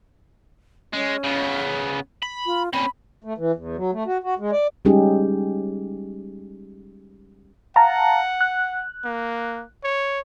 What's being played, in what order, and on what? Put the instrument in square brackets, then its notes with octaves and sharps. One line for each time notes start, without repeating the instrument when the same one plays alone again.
[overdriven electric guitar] G#3 [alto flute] C#4
[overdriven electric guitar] C#3 B3
B5
[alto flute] F4
[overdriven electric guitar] C4 C#4 [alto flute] B5
[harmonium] A3
E3
E2
F#3
A3
F#4
F#4
G#3
D5
[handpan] G3 G#3 C#4 D#4 G4 G#4
[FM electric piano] F5 A5 A#5 [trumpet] F#5
[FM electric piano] F#6
[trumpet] A#3
C#5